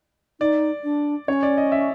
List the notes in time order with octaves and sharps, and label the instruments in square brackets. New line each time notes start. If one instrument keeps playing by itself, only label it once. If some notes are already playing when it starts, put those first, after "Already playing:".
[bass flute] D#4 [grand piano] D5
[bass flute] D4
[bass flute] C#4 [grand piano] C#5
[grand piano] D5
D#5
E5